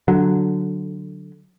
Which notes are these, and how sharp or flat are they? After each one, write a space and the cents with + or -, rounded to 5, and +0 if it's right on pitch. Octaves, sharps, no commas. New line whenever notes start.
D3 +0 F#3 +0